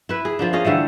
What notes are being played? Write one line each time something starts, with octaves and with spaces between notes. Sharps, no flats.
E4 B4
G#4
F3 A#3 D4
C#4 G#4 D#5 F5
D3 E3 G3 A3